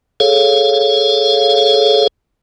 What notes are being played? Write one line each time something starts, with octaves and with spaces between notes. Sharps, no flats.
G#4 A4 C#5 F5